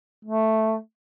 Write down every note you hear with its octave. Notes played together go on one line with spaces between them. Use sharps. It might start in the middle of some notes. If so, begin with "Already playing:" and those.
A3